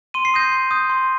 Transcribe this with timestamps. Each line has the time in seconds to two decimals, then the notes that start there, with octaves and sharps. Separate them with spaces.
0.14 C6 D#7
0.25 C7
0.34 D#6 G6 A#6 D#7
0.52 C6
0.71 D#6 G6
0.90 C6